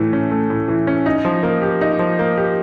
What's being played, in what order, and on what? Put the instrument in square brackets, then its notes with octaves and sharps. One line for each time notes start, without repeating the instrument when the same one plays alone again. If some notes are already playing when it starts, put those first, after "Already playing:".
Already playing: [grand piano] A2 E3 A3
C#4
A3
A2
E3
C#4
D#4
F3
A#3
G4
D#4
F3
A#3
G4